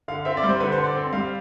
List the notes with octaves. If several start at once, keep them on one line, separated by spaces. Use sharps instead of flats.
D3 F5
C4 E5
D5
G3
C5
D3 B4
C5
D3
D5
C4
G3 F5